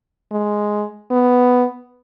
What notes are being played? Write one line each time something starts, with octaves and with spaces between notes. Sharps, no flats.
G#3
B3